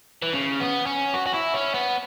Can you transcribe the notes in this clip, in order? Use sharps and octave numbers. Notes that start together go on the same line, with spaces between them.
E3
C#3
B3
C#4
F#4
F#4
E4
C#4
B3